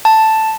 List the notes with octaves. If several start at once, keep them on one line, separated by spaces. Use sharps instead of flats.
A5